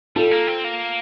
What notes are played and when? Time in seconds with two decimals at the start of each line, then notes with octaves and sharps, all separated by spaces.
0.16 G3 F4 A4
0.31 A#3
0.47 C4
0.64 A#3